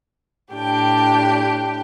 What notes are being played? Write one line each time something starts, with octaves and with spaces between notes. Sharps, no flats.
A2 D4 G4 G5